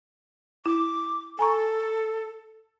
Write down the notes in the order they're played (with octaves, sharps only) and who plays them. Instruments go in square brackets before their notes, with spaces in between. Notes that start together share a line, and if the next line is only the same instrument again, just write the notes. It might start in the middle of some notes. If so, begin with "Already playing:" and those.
[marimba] E4 [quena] D6
[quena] A4 [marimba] G#5 A#5 C#6